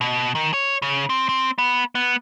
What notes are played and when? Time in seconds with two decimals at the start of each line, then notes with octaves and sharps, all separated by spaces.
0.01 B2
0.35 D#3
0.54 C#5
0.82 C#3
1.09 C4
1.29 C4
1.58 B3
1.95 B3